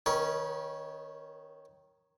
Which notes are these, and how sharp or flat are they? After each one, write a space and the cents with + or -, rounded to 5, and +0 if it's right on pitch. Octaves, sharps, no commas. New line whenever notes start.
D#3 +0 C#4 +0 B4 -45